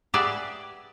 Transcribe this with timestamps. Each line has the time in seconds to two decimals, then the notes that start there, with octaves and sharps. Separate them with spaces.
0.14 G4 G#4 B4 D5 E5 F#5